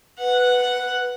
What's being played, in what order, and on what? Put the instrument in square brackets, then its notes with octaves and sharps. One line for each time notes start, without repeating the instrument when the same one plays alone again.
[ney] B4 [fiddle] F#5